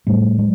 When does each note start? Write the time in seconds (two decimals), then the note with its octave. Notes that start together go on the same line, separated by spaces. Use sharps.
0.07 A2 G3 A3
0.28 A2
0.38 F#3 G#3